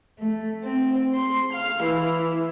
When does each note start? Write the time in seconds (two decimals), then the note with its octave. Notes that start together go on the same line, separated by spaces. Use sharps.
0.19 A3
0.63 C4
1.16 C6
1.55 F5
1.85 E3